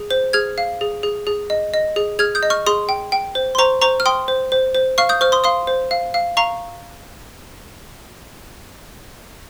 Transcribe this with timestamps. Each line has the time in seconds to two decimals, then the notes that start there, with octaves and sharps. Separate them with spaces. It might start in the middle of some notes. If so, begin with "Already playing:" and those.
Already playing: G#4
0.11 C5
0.33 G#4 F6 G#6
0.58 F5
0.81 G#4
1.03 G#4
1.27 G#4
1.50 D#5
1.74 D#5
1.96 G#4
2.19 G#4 F6 G#6
2.35 D#6 G6
2.43 D#5
2.50 C#6 F6
2.67 G#4 C6 D#6
2.89 G5
3.12 G5
3.35 C5
3.55 C6
3.58 C5 A#5 C#6
3.82 C5 A#5 C#6
4.00 F6
4.06 G5 C6 D#6
4.28 C5
4.52 C5
4.75 C5
4.98 F5 C#6 F6
5.09 D#6 G6
5.21 C5 C#6 F6
5.32 C6 D#6
5.44 F5 C6 D#6
5.67 C5
5.91 F5
6.14 F5
6.37 F5 A#5 C#6